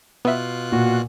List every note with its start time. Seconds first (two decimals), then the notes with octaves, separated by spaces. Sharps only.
0.25 B2 B3 F4 E5 F#6
0.72 A#2 F#4